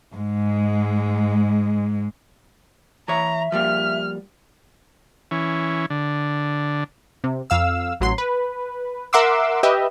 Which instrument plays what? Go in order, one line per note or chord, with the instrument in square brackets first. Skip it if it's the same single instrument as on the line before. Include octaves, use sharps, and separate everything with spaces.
[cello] G#2 G#3
[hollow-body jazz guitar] E3 C#5 [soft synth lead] E5 [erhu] A#5
[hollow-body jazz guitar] F3 G3 A#3 [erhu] F6
[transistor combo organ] E3 C#4
D3
[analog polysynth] C3
F2 F5 E6
A1 F#3 C6
B4
A#4 E5 F#5 C6 D6 E6
G4 B4 D#5 E5